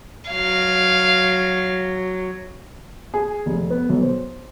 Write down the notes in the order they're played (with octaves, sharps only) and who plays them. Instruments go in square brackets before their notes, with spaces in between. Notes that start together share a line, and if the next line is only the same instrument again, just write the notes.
[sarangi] F#3 [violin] F5
[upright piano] G#4
F1
B3
B1
C5